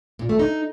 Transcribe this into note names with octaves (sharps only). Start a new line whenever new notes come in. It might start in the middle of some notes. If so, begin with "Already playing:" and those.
A#2
A3
D#4